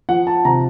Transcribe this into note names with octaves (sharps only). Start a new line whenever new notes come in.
F3 F#5
A5
C3 A#5